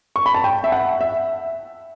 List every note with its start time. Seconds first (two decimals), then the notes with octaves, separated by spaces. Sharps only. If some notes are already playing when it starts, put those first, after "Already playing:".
0.16 C#6
0.26 B5
0.34 A5
0.44 G5
0.64 E5
0.72 F#5
1.01 E5